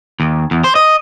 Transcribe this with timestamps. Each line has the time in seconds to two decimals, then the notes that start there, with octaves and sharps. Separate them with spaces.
0.20 D#2
0.51 E2
0.64 C5
0.75 D#5